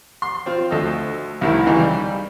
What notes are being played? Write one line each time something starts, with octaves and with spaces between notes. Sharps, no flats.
C6
C4 F4
D2 A4 D#5
C2 A2 D#3 E4
C#3 E3 D#4
G3